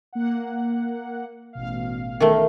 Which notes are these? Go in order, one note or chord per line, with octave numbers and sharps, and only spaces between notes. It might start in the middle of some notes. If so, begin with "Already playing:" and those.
A#3 F#5
A1 B2 F5
D#3 A3